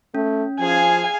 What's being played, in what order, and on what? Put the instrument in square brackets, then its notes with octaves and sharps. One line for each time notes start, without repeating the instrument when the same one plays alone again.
[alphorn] A3 [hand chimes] C#4
[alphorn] F3 [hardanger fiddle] G#4 F5 [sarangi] G#5